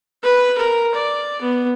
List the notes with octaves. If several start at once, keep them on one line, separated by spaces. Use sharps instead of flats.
B4
A#4
D5
B3